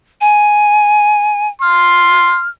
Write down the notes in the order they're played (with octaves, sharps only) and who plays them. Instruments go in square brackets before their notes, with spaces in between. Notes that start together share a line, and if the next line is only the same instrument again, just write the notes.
[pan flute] G#5
[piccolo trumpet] C6 [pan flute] F6